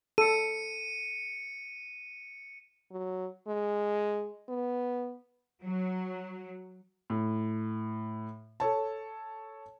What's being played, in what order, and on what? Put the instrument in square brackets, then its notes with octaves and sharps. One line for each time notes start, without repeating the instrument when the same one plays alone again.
[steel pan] A4 [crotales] C#7 D#7
[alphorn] F#3
G#3
B3
[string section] F#3
[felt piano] A2
A4 C#5 A5